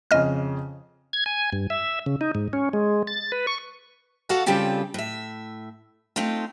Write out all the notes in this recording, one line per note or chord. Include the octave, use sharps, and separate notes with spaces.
F2 C#3 D#5 F6
G#6
G#5
G2
E5
C#3
D#4
G#2
C#4
G#3
A6
B4
C#6
F#4 A4 F5 F#5
C#3 G3 C4 F4 G4 A4
A2 E5
A3 C4 D#4 F4